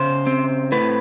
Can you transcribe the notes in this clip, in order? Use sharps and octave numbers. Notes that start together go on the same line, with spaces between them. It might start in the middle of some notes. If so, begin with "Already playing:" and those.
Already playing: C#3 C5
C4
A2 B4